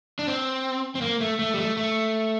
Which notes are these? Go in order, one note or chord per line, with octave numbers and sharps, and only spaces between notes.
D4
C4
C4
A#3
A3
A3
G3
A3
A3